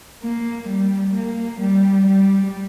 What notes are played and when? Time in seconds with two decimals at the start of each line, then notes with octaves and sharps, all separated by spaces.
0.23 A#3
0.68 G3
1.14 A#3
1.60 G3
2.07 G3